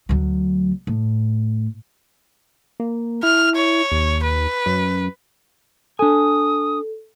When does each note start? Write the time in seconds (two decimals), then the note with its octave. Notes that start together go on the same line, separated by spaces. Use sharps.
0.09 D2 F#3
0.87 A2
2.80 A#3
3.23 E4 F6
3.56 C#5
3.92 D#2
4.23 B4
4.66 F#2
5.99 D4 A4 G#5 D#6